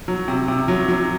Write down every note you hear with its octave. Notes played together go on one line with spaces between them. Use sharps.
F#3
C3
C3
F#3
F#3